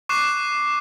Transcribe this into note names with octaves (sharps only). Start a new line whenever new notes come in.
C#6 D6 F#6 C7 E7